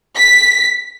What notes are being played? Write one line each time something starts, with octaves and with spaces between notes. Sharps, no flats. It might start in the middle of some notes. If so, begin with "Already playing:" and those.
B6